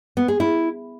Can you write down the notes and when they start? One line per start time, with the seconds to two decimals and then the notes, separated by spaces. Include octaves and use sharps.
0.17 B3
0.28 G#4
0.40 E4